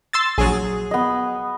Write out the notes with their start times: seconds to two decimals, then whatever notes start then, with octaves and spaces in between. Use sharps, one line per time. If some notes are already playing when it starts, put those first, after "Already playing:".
0.13 C6 E6 A6
0.38 A#1 F#3 G#4
0.91 B3 D#5